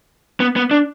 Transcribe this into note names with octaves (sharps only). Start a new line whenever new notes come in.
B3
B3
D4